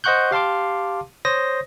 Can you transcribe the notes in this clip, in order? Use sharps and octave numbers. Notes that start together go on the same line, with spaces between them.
C5 D#5 F#5 C#6 F#6 G6
G4 F5 A5 C6 D6
C5 C#5 D#6 A#6